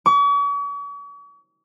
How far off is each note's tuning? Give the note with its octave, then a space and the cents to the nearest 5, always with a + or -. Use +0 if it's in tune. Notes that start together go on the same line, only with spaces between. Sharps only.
C#6 +45